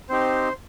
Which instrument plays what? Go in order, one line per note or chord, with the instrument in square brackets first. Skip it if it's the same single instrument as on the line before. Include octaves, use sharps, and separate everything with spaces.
[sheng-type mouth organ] C4 D#4 G4 C5